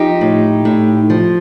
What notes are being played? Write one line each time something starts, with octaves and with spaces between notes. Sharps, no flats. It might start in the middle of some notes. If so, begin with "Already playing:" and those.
Already playing: F3 D#4 G4
A2
A2
F3